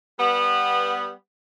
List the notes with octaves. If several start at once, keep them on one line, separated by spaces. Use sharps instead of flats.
G3 B3